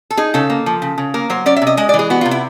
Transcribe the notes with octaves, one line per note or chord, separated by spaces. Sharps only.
A4
D#4 G#4
C#3 A4
A#3
F3
C#3
C#3
A#3 A#4
F#3 C5
C#4 D5
E5
C3
D#5
G#3 D#5
D5
E3
G#4
B3 F#4
C3 F4
E4